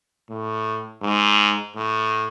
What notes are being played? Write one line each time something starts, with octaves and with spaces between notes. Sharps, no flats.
A2
G#2
A2